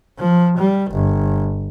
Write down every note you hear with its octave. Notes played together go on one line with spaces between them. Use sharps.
F3
G3
G1